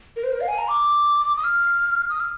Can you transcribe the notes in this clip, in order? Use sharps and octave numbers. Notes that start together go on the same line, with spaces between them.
A#4
C5
A#4
F5
G#5
A#5
D6
D#6
F6
D#6
F6